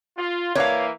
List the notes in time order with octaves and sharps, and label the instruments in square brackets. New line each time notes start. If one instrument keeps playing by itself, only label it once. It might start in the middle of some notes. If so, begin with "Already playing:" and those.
[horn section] F4
[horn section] E3 A#3 [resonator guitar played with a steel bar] C#5 F5